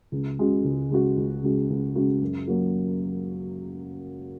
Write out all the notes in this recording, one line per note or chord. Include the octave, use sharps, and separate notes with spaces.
C#2
C#3 G#3 F#4
C#2
C#3 G#3 F#4
C#2
C#3 G#3 F#4
C#2
C#3 G#3 F#4
F#2
F#3 A#3 F#4